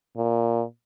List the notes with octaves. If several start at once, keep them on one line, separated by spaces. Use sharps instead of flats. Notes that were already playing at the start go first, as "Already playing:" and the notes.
A#2